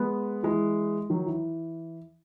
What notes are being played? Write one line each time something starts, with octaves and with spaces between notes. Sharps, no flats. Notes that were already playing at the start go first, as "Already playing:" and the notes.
Already playing: G#3 B3
E3 G#3
D#3 F#3
E3